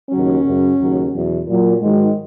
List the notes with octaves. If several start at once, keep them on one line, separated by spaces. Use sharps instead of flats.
D#2 C#3 F#3 C#4
F#2 C#3 F#3
D#2 C#3 F#3
E2 B2 F#3
A#2 F#3
G#2 D#3 F#3 G#3